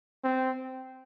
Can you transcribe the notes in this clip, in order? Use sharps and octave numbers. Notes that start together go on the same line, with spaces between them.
C4